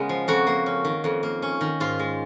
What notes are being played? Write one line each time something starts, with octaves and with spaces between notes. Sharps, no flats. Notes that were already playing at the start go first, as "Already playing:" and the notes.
Already playing: C#3 G#3 B3 A#4
F3
F2 F#4
A#3
C#4
D#3
F2
A#3
C#4
D#3
G#2 F4
G#3